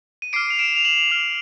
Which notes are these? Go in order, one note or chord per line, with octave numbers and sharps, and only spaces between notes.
D#7
D6 F6 C7 D7
F7
D7 E7
F7
E7 F#7
D6 F6